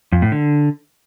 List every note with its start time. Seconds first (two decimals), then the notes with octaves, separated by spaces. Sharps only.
0.12 F2
0.22 A2
0.32 D3